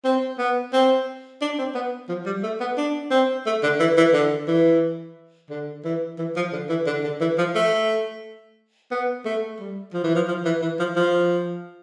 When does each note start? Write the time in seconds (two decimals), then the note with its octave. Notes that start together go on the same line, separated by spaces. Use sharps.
0.05 C4
0.39 B3
0.73 C4
1.41 D4
1.58 C4
1.75 B3
2.09 F3
2.26 G3
2.43 A3
2.60 B3
2.77 D4
3.11 C4
3.46 A3
3.63 D3
3.80 E3
3.97 E3
4.13 D3
4.48 E3
5.50 D3
5.85 E3
6.19 E3
6.36 F3
6.53 D3
6.69 E3
6.86 D3
7.04 D3
7.21 E3
7.38 F3
7.55 A3
8.91 B3
9.25 A3
9.60 G3
9.94 F3
10.04 E3
10.15 F3
10.28 F3
10.45 E3
10.62 E3
10.79 F3
10.96 F3